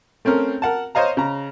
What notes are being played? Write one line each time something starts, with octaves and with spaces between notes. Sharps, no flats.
A3 C4 C#4 A#4
A#4 F#5 A5
C5 C#5 D#5 F5 A#5
C#3 A#5